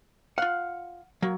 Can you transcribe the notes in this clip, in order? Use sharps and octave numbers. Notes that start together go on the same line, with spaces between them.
F4 F5 F#5
F#3 A#3